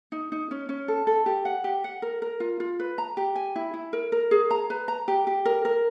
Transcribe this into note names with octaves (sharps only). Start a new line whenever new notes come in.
D#4
D#4
C#4
C#4
A4
A4
G4
F#5
G4
F#5
A#4
A#4
F4
F4
B4
A#5
G4
G#5
E4
E4
A#4
A#4
G#4
A#5
B4
A#5
G4
G4
A#4
A#4